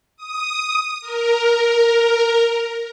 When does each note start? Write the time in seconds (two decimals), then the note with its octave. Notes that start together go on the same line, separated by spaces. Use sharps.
0.17 D#6
1.01 A#4